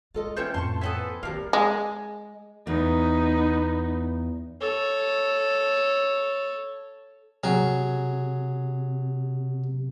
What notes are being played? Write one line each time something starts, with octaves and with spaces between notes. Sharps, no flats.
G#3 F4 A4 D#5
E3 C#4 F4 C5 C#5 E5 G5
F2 A2 A5 C6 C#6
E3 B3 C4 A4 C5 E5 G#5
G2 D#3 A#3 D4 F5
G#3
E2 B3 D#4
A4 C#5
C3 F#3 G#4